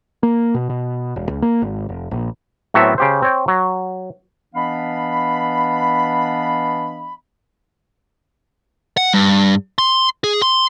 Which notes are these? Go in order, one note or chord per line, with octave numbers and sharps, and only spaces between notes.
A#3
B2
B2
E1
C#2
A#3
G#1
F1
A#1
A2 F#3 B3 C4 A4 E5
C#3 G4 C5
C4 C#5 G5
F#3
E3 B3 D4 D#5 F5 B5
F#5
G2
C6
G#4
C6